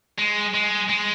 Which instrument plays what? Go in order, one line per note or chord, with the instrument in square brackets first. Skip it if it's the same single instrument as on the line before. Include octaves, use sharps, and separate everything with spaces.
[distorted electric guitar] G#3
G#3
G#3